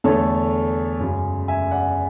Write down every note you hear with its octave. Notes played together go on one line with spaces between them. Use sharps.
E2 D3 A3 A4 C#5
F#2 C#3 G#3
E5 G#5
D5 F#5